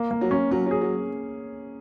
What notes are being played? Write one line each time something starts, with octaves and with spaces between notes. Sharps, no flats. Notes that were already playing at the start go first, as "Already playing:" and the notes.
Already playing: A#3
A#3
F#3
C#4
F#3 C#4
F#3 G#4
F#3